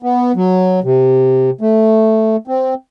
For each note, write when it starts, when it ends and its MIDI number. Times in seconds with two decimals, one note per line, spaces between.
0.03 0.32 59
0.36 0.80 54
0.84 1.50 48
1.61 2.36 57
2.47 2.74 60